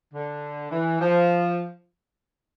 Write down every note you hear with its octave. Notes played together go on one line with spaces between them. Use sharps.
D3
E3
F3